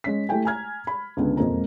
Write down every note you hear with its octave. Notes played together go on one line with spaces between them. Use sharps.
G#3 C#4 B6
A3 E4 G4 G5 G#5
G#5 A#5 F6 G#6
B5
C#2 D3 B3
E1 F2 G#3 A#3 F4 A#5